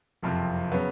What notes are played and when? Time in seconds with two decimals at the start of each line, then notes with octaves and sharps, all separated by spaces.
0.22 F#1 F2 C3 F3
0.72 C#3 F#3 B3